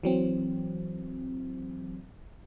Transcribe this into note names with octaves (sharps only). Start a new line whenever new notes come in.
E3 F#3 C4